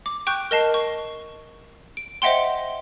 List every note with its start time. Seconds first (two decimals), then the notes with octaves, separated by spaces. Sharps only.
0.06 D6
0.27 G5 C#6 F#6 G6
0.51 A#4 D#5 A5 C7
0.74 C#6
1.97 D7
2.22 C5 D#5 E5 F#5 G5 C6